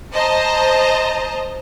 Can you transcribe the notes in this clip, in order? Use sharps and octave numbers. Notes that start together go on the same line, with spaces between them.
C5 D#5 A5 A#5